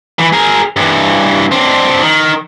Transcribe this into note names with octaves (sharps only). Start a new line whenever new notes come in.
E3
G#4 A#4
G2 E3
C4 D4
D#3